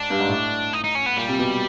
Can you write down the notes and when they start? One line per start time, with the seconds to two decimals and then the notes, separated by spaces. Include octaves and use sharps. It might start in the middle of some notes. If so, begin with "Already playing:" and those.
Already playing: G#2 D4
0.10 G2
0.19 G#2
0.28 A2
0.73 D#4
0.84 D#4
0.95 C#4
1.06 B3
1.17 A#2 G3
1.29 C3
1.39 B2